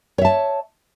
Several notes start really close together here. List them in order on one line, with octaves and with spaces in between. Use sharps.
C#5 E5 A5